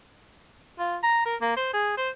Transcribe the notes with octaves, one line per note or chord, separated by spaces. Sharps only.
F4
A#5
A#4
A#3
C5
G#4
C5